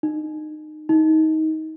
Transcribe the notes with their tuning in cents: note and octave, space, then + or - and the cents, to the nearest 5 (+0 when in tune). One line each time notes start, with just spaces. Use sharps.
D#4 -25
D#4 +20